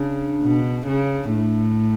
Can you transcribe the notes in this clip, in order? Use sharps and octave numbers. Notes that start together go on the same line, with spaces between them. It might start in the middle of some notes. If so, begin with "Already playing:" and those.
Already playing: C#3 D4
B2
C#3
A2